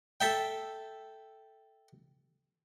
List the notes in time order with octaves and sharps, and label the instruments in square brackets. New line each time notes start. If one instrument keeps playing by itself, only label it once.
[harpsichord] A4 E5 G5